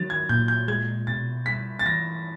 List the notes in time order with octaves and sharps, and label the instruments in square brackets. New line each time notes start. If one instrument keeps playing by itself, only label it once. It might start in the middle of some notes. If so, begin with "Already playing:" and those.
Already playing: [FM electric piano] D#3 F#3 [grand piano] A6
[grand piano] G#6
[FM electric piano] A#2 [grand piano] G6
[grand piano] G6
[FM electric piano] G#3 [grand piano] G#6
[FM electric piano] B2 [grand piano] A6
[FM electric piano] G3 [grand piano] B6
[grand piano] A6
[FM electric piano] E3 [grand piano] A#6